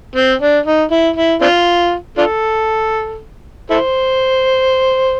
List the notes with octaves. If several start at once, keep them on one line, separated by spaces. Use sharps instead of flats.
C4
D4
D#4
E4
E4
C4 D4 F4
D4 F4 A4
E4 A4 C5